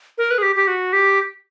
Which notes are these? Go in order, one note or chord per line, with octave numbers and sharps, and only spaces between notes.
A#4
B4
G#4
G4
G4
F#4
G4